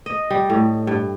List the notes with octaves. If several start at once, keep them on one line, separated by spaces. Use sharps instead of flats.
D#5
G3
A2
G2